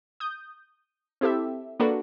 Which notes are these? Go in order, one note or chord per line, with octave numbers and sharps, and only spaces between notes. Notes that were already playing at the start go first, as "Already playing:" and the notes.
D#6 G6
C4 E4 G4 A4 E5
A#3 D4 F#4 A4 B4